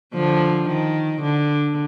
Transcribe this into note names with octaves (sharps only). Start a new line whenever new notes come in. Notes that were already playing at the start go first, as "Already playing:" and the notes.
D3 F3
D#3
D3